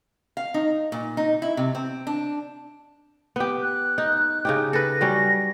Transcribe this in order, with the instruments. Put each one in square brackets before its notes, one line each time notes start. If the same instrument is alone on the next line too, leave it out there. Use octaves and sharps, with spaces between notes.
[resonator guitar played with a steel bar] F5
D#4
A#2
D#4
E4
C3
C4
D4
[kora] B3 G4
[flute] F#6
[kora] D#4
C#3 D#4 G4
[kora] A4 B4 [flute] A#6
[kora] F#3 G3 C#4